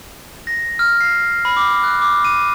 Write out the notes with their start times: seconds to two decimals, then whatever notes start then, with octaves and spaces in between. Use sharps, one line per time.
0.47 A#6
0.79 F6
1.01 C7
1.45 B5
1.57 D6
1.84 F#6
2.01 D6
2.25 D#7